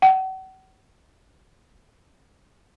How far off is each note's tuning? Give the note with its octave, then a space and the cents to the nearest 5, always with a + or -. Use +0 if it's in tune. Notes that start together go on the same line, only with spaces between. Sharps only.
F#5 +40